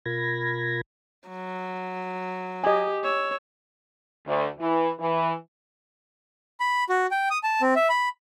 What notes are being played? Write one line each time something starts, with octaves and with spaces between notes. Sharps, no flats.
B2 F4 A#4 B5 G#6 A#6
F#3
G4 D#5 G#5
C#5 E6
D2
E3
E3
B5
F#4
G5
D#6
A5
C4
E5
B5